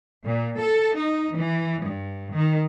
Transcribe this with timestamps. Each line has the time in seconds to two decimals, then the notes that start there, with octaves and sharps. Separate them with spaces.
0.25 A#2
0.59 A4
0.95 D#4
1.33 E3
1.83 G2
2.33 D#3